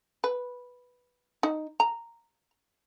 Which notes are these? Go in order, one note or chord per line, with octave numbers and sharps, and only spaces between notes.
B4
D#4
A#5